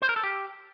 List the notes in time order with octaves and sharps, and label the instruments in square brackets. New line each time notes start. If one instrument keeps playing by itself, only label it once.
[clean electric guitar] C5
A#4
A4
G4